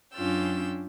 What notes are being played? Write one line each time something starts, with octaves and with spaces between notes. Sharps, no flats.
F#2 C#4 D4 F4 G5 E6